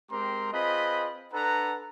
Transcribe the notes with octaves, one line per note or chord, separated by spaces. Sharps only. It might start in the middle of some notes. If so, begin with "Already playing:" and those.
G#3 C4 G4 A#4 A#5 C6
C4 F4 G#4 B4 D#5 B5
D4 A4 B4 F#5 A#5